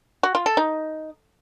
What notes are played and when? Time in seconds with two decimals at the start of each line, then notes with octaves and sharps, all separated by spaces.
0.23 F#4
0.35 F4
0.46 A4
0.57 D#4